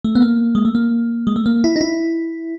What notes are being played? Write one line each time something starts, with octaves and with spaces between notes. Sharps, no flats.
A3
B3
A#3
G#3
A3
A#3
G#3
A3
A#3
E4
D#4
E4